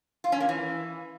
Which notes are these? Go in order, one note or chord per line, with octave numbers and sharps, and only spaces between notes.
F4
C#4
A#3
E3